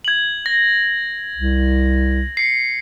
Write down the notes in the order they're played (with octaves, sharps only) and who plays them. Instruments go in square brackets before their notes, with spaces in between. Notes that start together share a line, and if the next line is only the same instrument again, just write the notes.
[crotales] G#6 F#7
A#6
[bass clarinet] C2
[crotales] C7 C#7